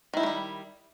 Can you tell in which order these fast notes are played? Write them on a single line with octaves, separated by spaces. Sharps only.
D#3 E4 D#4 A3 G3